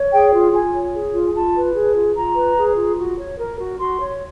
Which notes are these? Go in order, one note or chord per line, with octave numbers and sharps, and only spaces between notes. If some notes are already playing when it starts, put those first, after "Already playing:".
Already playing: C#5
G#4 G5
F4
F4 G#5
C#5
G#4
F4
G#5
F4 A5
B4
G#4
F4
F4 A#5
B4
G#4
F4
F#4
C#5
A#4
F#4
F#4 C6
C#5